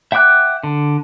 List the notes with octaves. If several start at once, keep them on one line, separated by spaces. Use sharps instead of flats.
E5 F#5 G5 D6 F#6
D3